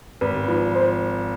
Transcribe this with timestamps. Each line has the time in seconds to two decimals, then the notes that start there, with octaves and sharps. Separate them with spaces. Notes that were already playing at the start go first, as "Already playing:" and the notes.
0.21 G#1 B4
0.48 F3 B4
0.75 C5